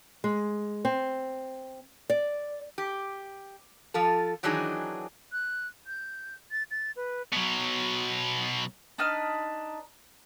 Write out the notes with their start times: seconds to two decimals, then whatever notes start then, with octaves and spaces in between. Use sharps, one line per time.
0.24 G#3
0.85 C4
2.10 D5
2.78 G4
3.94 F3 F4 A4
4.43 D#3 E3 F#3 D4 D#4 G#4
5.32 F#6
5.87 G6
6.51 A6
6.71 A6
6.96 B4
7.33 B2 F#3
8.98 D4 D#4 B4 F6